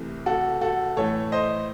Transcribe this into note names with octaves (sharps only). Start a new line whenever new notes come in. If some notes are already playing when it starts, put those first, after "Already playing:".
Already playing: C2 C3 E3 A3
F#4 A4
F#4 A4
A2 E3 A3 A4 C#5
C5 D#5